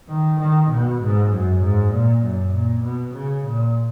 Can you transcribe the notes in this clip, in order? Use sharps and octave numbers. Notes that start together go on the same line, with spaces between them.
D#3
D#3
B2
G#2
F#2
G#2
A#2
F#2
A#2
B2
C#3
A#2